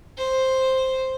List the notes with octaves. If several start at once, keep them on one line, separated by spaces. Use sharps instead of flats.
C5